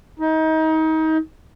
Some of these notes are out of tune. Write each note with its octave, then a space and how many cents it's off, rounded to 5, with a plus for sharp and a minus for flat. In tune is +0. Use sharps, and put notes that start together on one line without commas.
D#4 +30